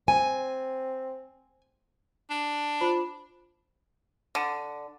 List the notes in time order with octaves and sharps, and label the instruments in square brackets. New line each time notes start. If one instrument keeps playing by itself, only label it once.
[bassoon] C4 [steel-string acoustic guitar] G#5
[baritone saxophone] D4
[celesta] F4 C5 B5
[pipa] D3